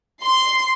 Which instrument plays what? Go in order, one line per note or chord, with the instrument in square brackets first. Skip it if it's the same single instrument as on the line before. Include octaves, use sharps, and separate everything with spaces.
[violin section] C6